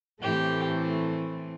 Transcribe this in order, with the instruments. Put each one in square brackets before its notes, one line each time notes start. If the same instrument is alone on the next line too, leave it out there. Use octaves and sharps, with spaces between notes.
[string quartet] A2 E3 A3 C4 G4